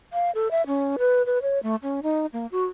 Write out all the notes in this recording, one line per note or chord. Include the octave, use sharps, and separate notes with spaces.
F5
A4
E5
C#4
B4
B4
C#5
A3
C#4
D#4
A#3
F#4